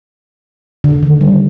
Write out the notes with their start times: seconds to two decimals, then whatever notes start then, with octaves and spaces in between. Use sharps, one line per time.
0.84 D3
1.03 D#3
1.21 G3